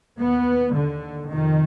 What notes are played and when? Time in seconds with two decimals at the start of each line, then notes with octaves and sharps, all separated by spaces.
0.19 D#2 B3
0.73 D#2 D3
1.28 F2 C3 D#3